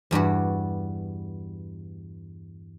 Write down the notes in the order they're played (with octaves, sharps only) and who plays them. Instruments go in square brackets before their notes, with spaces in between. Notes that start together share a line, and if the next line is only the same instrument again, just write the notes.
[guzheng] E2 G2 G3 F#4